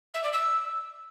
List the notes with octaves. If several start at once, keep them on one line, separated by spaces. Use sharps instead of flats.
E5
D5
E6